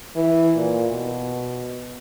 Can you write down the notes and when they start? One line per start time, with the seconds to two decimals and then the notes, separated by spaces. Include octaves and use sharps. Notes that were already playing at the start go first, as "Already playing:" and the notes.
0.16 E3
0.56 A#2
0.91 B2